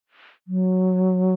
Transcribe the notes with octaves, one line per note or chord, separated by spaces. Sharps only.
F#3